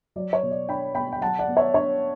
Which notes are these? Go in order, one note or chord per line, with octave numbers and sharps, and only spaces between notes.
F#3 D5
C#5
B2
D5
D4 G5 B5
B2 G5 B5
G5
F#3 F#5 A5
D5 F#5
B3
C#5 E5
D4 C#5